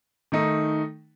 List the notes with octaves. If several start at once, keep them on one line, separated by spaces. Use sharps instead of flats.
D#3 A3 D#4